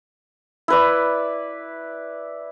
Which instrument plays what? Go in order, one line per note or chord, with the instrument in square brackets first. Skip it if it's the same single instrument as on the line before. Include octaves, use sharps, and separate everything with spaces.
[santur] E4 B4 D5